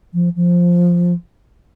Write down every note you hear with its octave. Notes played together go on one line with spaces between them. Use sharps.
F3
F3